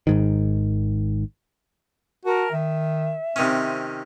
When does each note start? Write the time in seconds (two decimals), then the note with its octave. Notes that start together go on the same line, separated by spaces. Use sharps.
0.07 G#1 G#2 D#3
2.25 F#4 A#4 A5
2.52 D#3 E5
3.36 C3 D#3 C4 C#4